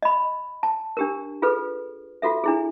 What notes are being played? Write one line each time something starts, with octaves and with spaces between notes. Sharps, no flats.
D#5 B5
A5
D4 G4 A#4
F4 G#4 A4 B4
F4 F#4 A4 E5
D4 E4 G#4